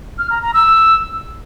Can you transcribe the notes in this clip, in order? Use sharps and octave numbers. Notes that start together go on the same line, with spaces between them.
F6
A#5
A#5
E6